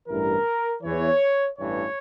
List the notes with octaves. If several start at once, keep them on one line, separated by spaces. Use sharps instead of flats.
A1 G2 E3 A#4
E2 E3 C#5
A1 G2 E3 C#5